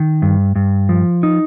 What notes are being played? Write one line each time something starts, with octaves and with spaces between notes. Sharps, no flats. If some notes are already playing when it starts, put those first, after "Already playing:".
Already playing: D#3
G2
G2
F3
D#4